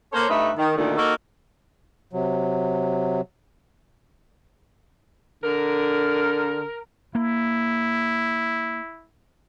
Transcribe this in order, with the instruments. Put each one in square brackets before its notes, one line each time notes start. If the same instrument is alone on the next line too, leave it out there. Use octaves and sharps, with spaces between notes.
[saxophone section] A#3 A4 C5 C#5
G2 A3 D#4 B4 E5
D#3
D2 A#2 D3 D#3
A#3 D#4 F#4 A4 A#4
[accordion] C3 F#3
[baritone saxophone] D3 [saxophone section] A#4
[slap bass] A#3 [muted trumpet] E4